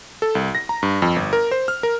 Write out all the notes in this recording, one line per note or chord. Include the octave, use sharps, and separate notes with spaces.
A4
C2
A#6
A#5
G2
F2
G1
A#4
C5
F6
A#4